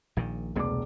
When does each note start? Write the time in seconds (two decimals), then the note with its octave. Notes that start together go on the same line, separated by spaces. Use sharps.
0.17 A#1 A#2 D#3
0.56 E1 C2 B2 A3 D6